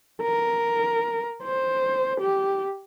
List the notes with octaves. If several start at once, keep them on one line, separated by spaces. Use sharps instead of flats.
A#4
C5
G4